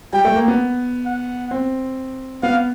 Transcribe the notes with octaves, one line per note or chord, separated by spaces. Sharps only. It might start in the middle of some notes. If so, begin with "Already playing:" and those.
G3 G5
A3
A#3
B3
F#5
C4
B3 F5